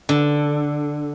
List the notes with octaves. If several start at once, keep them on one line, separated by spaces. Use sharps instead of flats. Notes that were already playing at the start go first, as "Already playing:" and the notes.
D3